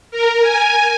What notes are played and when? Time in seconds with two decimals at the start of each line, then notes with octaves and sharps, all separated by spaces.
0.11 A#4
0.42 G#5